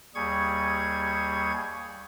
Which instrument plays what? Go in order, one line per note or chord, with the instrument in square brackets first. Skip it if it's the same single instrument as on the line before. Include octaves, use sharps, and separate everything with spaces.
[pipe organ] D#2 G3 G#4 C#6 G#6